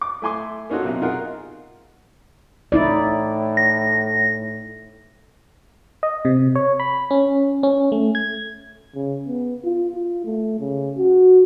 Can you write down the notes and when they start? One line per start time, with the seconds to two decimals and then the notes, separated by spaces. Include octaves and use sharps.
0.01 D6
0.22 A3 E4 G#5 C6 D6
0.70 A#3 C#4 D#4 F4 F#4 A4
0.83 B1 C3
1.01 D#4 F4 G#4 A#4 F#5
2.72 A2 D#4 E4 D5
3.57 A#6
6.03 D#5
6.25 C3
6.55 C#5
6.80 B5
7.11 C#4
7.63 C#4
7.92 A3
8.15 G#6
8.95 C#3
9.27 B3
9.64 F4
9.94 F4
10.25 A3
10.60 C#3
10.97 F#4